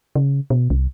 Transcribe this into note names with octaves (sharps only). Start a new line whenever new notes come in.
C#3
B2
C2